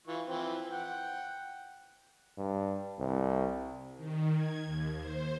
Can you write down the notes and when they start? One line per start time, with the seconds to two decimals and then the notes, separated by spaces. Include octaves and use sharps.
0.07 E3 F4 C#6
0.28 E3 F3 C4
0.71 F#5 G5
2.37 G2
2.99 C2
3.97 D#3
4.34 G#6
4.65 D#2
4.96 C5